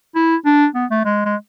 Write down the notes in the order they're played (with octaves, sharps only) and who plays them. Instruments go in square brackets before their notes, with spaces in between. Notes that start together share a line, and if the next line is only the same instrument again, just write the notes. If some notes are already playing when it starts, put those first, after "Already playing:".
[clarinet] E4
D4
B3
A3
G#3
G#3